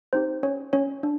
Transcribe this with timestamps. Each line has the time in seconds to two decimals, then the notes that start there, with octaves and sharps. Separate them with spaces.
0.13 C4 D#4 G4 C5
0.43 C#4 C#5
0.73 C#4 C#5
1.03 D4